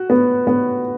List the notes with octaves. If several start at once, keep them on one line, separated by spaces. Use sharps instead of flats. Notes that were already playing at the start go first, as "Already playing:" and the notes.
Already playing: F#4
B3
B3